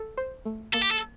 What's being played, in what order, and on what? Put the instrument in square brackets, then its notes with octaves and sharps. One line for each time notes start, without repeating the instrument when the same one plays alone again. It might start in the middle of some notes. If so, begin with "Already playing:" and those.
Already playing: [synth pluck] A4
C5
A3
[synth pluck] A#3 [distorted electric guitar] A4
[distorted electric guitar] G4
A4